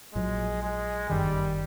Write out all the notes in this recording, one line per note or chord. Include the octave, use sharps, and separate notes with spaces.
A#1 A#2 F#3 G#3
G#3
G1 F#2 D#3 G3